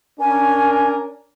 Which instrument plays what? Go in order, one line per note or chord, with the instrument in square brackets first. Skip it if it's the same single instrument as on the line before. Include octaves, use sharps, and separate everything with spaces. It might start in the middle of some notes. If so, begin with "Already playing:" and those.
[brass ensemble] C#4 D4 A#4 [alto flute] G#5